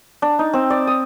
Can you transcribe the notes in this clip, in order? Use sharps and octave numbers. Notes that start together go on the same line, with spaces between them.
D4
D#4
C4
D5
D#6